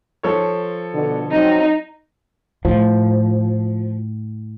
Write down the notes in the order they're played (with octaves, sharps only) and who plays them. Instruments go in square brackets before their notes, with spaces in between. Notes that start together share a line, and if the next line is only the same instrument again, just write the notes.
[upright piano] F3 A4 C#5
[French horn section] B2 D3
[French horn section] F#3 C4 [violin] D#4
[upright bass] A2 [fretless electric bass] F3